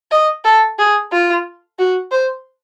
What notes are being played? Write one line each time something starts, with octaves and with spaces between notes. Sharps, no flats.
D#5
A4
G#4
F4
F#4
C5